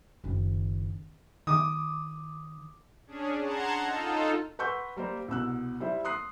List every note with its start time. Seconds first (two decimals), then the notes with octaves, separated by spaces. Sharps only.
0.24 F#1 D#3
1.47 D#3 D6 D#6
3.07 C#4 D4 G#4
3.41 F#5 A5 A#5 C6 G#6
3.82 D#4 F4 A4
4.59 B4 F#5 C6 C#6 E6 G6
4.97 G3 A#3 C5
5.28 C2 B2 E6 F#6
5.80 G3 E4 C5
6.05 C6 D#6 F#6 C7